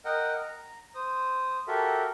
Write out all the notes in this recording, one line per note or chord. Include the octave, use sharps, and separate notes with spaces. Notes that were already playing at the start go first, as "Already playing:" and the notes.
A#4 D#5 F#5 G5
A#5
C5 D#6
F#4 G4 A4 A#4 E5